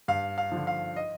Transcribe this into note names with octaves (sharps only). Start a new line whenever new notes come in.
G2 F5
F5
D3 F3
F5
D#5